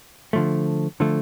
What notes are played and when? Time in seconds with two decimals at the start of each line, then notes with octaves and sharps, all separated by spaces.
0.33 D3 F3 A3
1.00 D3 F3 A3